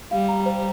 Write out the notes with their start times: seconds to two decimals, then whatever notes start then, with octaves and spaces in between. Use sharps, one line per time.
0.11 G3 F5
0.29 A#5
0.46 C5